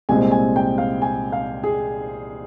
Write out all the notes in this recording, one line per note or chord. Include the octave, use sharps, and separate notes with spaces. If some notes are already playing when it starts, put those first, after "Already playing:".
C2 A#2 G#3 C4 G#5
G#5
G5
F5
G#5
F5
G#4